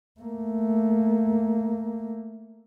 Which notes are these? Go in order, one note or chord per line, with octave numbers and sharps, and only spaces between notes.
A3 A#3